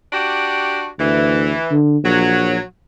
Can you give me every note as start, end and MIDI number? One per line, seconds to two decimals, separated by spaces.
0.12 0.87 62
0.12 0.87 66
0.12 0.87 67
0.99 1.52 38
0.99 1.73 52
1.71 1.97 50
2.03 2.57 34
2.03 2.61 54